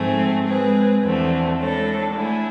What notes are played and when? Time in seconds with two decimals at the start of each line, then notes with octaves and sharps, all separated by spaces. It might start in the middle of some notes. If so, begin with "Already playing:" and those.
Already playing: G#2 F3 A3 C4 G#4
0.48 G#3 C4 G#4 B4
1.03 E2 D3 F3 A3 C4
1.59 A2 G#3 D4 A4
2.14 D3 A3 E4 G#4